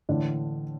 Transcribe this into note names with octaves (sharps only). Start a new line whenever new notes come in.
A2 D3 E3 D4